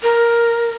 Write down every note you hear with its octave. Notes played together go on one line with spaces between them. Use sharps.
A#4